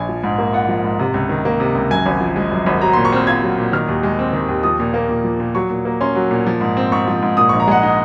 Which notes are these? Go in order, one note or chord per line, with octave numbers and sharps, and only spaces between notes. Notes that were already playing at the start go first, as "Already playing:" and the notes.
Already playing: A#1 G#5
F3
G#2
A#3
F4 F#5
F3
G#2
C3
C#2
D#3
A#3
C3
C#2
F#2 G#5
G#1
F3
G#3
F#2
G#1
F#3 A#5
A#2 C6
C#6
C4 F6
F4 G#6
F#3
A#2
D#3 F6
D#2
G#3
C4
D#3
D#2
F3 D#6
A#2
A#3
A#2
F3
A#2
F#3 C#6
A#2
A#3
C#4 C6
F#3
A#2
F3
G#2
C4
G#2 C#6
F3
G#2
A#2 D#6
A#1 C#6
A#5
G#3 F#5
D#4 D#5